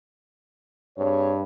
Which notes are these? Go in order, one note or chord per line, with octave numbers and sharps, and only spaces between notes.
G2 C4 G#4 C#5